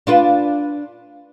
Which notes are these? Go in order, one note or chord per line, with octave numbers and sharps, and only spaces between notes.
D4 F4 B4